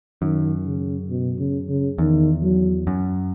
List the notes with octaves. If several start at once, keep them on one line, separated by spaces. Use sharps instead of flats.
F#2 D#3
C#3
B2
C#3
C#3
E2 D#3
F#3
F#2